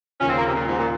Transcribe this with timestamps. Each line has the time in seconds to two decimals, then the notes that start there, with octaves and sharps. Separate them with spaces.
0.20 D#2 C#3 F3 C#4
0.29 C4
0.37 A#3
0.46 C3
0.55 A#2
0.67 G#2
0.78 A#2